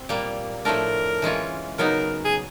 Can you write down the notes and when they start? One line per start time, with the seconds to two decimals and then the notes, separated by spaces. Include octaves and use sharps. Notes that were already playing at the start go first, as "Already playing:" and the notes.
Already playing: C4
0.09 A#2 G3 A#3
0.65 A2 F3 A3 D4 A#4
1.22 E3 G#3 C#4 F4
1.78 C#3 F#3 B3 D#4 A#4
2.25 G#4